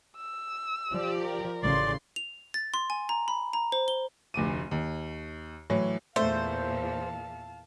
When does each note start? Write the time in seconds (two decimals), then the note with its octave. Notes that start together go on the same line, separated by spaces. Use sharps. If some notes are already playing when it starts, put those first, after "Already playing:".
0.17 E6
0.91 F3 G4 D5
1.22 A#4
1.63 A1 C#3 D5 C6
2.16 F7
2.54 A6
2.74 C6
2.90 G#5
3.09 A#5
3.28 B5
3.53 A#5
3.72 C5
3.88 G7
4.34 F1 D2 D6 D#7
4.71 D#2
5.70 A2 E3 F#3
6.16 E2 A#2 E3 A3 C5 F5 A5